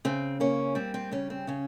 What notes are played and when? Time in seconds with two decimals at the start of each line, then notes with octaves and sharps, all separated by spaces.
0.05 C#3 C4
0.40 A#3 C#4
0.75 G3 C4
0.94 C4
1.11 C#3 C#4
1.30 C4
1.47 C#3 C#4